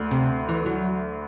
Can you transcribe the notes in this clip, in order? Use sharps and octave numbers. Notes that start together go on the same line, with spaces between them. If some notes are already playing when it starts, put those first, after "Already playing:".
Already playing: D2 D3 A3
C3
E3
F#3